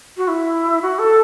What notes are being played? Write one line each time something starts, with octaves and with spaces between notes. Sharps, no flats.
F#4
E4
F#4
A4